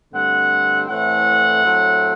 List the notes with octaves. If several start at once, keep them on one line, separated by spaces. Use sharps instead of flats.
G2 D3 A3 C4 F#5
A2 E3 A3 C4 F#5
A2 F#3 A3 C4